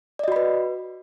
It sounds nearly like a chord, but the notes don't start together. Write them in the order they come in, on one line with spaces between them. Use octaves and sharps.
D5 D#5 F#4 B5 B4